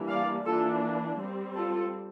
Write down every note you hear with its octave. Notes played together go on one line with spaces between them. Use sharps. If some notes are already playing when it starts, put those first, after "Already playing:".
Already playing: E3 G3 A#3 D4
D5 F5
E3 A#3 D4 F4 A4
G3 C4
F4 A4